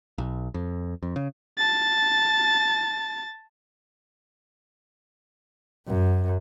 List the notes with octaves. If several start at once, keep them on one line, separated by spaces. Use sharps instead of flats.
B1
F2
F2
C#3
A5 A6
F#2